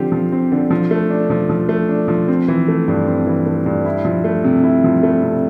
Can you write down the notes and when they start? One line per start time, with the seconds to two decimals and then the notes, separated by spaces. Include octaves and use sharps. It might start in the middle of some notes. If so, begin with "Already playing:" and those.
Already playing: D3 F3 C4 G4
0.12 F3
0.32 C4
0.52 D3
0.70 F3
0.91 A3
1.10 D4
1.30 F3
1.49 F3
1.69 A3
1.89 D4
2.08 F3
2.28 C4
2.48 E3
2.68 A3
2.88 G2
3.07 C4
3.27 E3
3.46 A3
3.66 G2
3.85 E4
4.05 F3
4.24 A3
4.44 C3
4.63 E4
4.84 F3
5.03 A3
5.23 C3